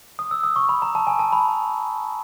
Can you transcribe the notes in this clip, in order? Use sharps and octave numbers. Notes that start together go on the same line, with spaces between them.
D#6
E6
D#6
C#6
B5
A#5
A5
G#5
A5
B5